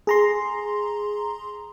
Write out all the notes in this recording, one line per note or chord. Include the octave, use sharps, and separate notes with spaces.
G#4 A#5 C6